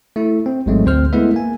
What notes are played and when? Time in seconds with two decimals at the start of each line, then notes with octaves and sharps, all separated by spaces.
0.16 A3 E4
0.46 C4
0.66 A1 G#2 F#3 G#3 A3 C4
0.85 D2 C4 C5 F6
1.13 G#3 A3 B3 E4 B4 E5
1.34 A#3 G#5